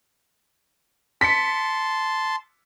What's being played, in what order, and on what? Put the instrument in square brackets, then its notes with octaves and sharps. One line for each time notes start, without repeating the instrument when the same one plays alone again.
[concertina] A5 C6 [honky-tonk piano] B6 C#7